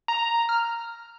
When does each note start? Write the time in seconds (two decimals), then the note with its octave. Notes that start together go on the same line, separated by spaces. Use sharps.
0.08 A#5
0.49 F6